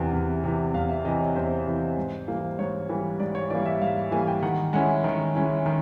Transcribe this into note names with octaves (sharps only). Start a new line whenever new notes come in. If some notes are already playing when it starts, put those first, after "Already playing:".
Already playing: E2 C3 E3
E2
C3 E3
E2 F5
E5
C3 E3 D#5
C#5
E2 C5
C3 E3
G#2
E3 G3 A#3
G#2 C#5
E3 G3 A#3
G#2 D5
C#5
E3 G3 A#3 D5
E5
G#2 F5
E3 G3 A#3 G#5
G5
D#3 F#5
G#3 C#4 E4 F#5
D#3
G#3 C#4 E4
D#3